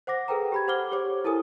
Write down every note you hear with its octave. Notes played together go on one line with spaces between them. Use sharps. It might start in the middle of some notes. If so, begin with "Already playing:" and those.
C5 F#5 D6 A#6
G#4 A4 B4 G5 A#5
G4 B5 G#6
C5 F#5 D6 F6 G7
G4 C5 C#5 D6
E4 A4 A#4 G#5 D#6